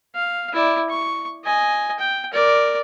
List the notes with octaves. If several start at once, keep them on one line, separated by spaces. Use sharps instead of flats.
F5
E4 D5
C#6
D#5 G#5
G5
A#4 D5